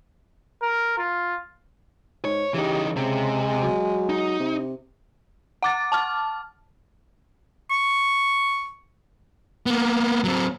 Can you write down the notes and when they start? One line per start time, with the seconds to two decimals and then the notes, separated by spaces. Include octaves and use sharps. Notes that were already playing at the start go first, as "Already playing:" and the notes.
0.62 A#4
0.98 F4
2.25 G#2 C#5
2.54 C#3 E3 D#4 G4
2.96 C3 G#3
3.62 F#3
4.09 D#4
4.39 C3
5.63 F#5 D6 A6
5.92 A5 D6 F6
7.71 C#6
9.66 A#3 B3
10.24 F#3 C4